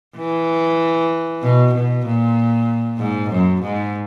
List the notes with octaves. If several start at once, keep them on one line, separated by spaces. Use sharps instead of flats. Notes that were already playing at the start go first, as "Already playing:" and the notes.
E3
B2
B2
A#2
G#2
F#2
G#2